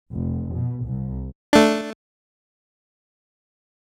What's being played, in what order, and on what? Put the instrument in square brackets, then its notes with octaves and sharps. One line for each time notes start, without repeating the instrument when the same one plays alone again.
[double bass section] F1
B2
C2
[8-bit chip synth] A3 D4